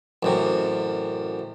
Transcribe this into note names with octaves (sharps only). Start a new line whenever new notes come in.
A1 F#2 C3